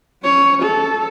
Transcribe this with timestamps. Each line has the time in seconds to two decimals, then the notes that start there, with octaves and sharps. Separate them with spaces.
0.23 C#4 C#5
0.62 A4